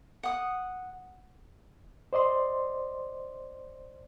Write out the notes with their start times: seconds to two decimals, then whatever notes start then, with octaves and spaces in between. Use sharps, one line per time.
0.23 F#5 D#6
2.13 C5 D5 D#5 C6